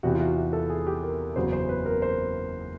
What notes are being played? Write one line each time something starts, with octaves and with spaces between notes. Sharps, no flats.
E2 C3 E3 F#4
F4
F#4
G4
A4
G#4
G4
A#4
F#1 E2 C#3 F#3 B3 C5
C5
B4
A#4
C5